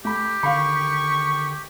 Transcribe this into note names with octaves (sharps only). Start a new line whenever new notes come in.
A3 G4 B5
D3 D#3 F5 B5 C#6